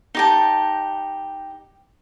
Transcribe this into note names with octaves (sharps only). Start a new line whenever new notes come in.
D#4 G4 A5